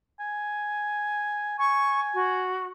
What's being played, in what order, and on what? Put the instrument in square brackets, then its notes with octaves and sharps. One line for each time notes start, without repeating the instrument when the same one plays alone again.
[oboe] G#5
[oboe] G#5 [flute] C#6
[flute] F#4